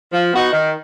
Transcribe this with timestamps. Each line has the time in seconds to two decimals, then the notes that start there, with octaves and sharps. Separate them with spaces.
0.13 F3
0.34 B3 D#4 F#4
0.53 D#3